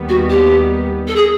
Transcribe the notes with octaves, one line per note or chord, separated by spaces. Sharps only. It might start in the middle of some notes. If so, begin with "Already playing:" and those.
Already playing: D#2 D#3 G3 B3
F#4
G4
A4
G#4